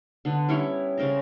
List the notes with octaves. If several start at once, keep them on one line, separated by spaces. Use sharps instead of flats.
D3 B3
G3 C#4 E4 C#5
C#3 A#4 C5 A#5